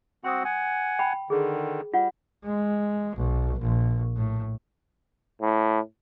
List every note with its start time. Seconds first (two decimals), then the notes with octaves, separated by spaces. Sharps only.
0.24 C4 F#4 F#5 C6 D#6
0.45 F#5 G#5
0.99 G5 B5
1.30 D3 D#3 G#4
1.94 G3 F4 F#5
2.45 G#3
3.16 B1
3.60 A#1
4.17 A2
5.41 A2